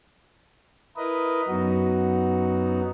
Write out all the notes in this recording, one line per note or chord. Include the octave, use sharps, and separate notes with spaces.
E4 A#4 B4 D#5
F#2 F#3 B3 D#4 F#4